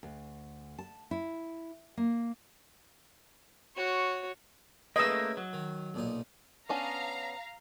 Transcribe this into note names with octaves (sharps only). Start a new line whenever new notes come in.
D2
A5
E4
A#3
F#4 C#5
A3 A#3 C#4 G#4 B4 D#5 E6
F#3
D#3
B1 A#2 D#4
B3 C#4 D4 F5 A#5